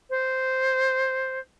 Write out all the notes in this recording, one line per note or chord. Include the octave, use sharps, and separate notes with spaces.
C5